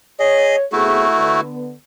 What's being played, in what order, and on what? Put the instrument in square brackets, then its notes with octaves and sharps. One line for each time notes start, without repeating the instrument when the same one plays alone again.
[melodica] G#4 D#5 [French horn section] C#5
[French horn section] C3 B3 G#4 [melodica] A3 E4 F#4
[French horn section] D3 B3